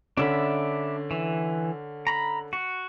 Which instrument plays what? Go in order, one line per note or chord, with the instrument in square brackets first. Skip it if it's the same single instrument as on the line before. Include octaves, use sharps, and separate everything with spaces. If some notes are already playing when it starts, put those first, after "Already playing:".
[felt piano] D3 C#4 [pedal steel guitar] D4 E5 B5
[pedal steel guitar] E3
A#5 B5
F#4